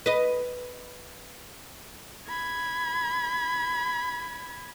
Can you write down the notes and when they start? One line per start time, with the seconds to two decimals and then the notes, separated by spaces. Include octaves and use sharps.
0.06 B4 D#5
2.28 B5 G#6